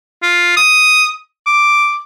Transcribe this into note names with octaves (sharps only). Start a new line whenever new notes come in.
F4
D#6
D6